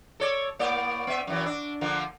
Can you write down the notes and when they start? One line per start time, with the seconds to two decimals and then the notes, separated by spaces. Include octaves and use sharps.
0.20 A4 C#5 D5
0.59 A2 A#3 D5
1.07 B3 E5
1.27 F#2 E3
1.46 D4
1.81 D3 F3 A#3